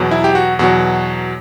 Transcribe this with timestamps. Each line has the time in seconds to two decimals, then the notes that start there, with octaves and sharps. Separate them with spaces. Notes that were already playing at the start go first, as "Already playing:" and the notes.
Already playing: E2 B2 F#3
0.11 E4
0.24 G4
0.35 F#4
0.59 E2 B2 F#3 F#4